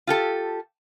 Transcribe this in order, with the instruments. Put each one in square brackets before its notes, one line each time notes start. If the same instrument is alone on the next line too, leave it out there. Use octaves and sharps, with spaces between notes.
[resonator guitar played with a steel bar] F4 G4 A4